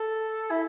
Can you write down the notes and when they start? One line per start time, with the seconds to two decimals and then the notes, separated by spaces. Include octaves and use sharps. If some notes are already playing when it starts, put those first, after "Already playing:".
Already playing: A4
0.51 E4